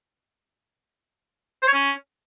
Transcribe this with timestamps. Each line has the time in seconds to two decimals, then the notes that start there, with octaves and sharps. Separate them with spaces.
1.62 C5
1.68 C#5
1.73 C#4